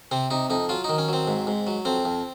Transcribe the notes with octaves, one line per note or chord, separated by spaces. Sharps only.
C3 C4
C3 D#4
F2 D#4
F#3 F4
D#3 D#4
C#4
F#3 C4
G#2
G#2
F#3
F2 C4
F2